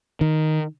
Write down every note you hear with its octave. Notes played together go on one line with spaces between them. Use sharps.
D#3